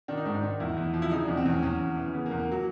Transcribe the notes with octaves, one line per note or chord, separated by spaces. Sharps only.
D#3 D4
D#4
G#2 D4
D#4
D#3 D4
E2 E4
E2
F3
E4
C#3 D#4
E2 D4
C4
E2 C#4
E2 C#4
E2
E3
C#3 B3
A#3
E2
A#3
F#3